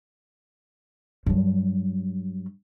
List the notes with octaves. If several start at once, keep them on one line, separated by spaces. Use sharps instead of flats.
G2 F#3